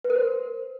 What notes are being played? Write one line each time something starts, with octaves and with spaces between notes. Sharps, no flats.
B4
A#4
C5